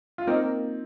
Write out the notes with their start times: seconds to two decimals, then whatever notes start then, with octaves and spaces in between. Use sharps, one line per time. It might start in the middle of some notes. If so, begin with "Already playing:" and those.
0.18 F4
0.27 A#3 C4 D#4